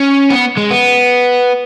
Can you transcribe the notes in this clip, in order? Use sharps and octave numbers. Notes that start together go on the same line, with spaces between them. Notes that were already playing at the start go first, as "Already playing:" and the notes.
Already playing: C#4
B3
G#3
B3